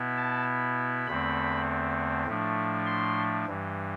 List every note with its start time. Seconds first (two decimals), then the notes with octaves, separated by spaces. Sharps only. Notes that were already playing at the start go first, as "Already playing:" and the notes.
Already playing: B2 B3 E4
0.17 A5
1.07 E2 D3 A3 C4 B5
2.26 A2 F3 A3 D4
2.86 C6
3.45 G2 E3 G3